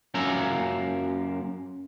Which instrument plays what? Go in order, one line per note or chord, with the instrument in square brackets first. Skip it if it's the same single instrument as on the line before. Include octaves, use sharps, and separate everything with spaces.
[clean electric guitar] F#2 A#3 C#4 F4 E5 A#5